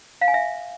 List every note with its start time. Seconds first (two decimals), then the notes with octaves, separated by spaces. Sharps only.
0.21 F5
0.28 G#5
0.34 E5